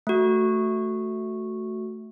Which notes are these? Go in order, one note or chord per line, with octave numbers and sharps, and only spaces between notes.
A3 F#4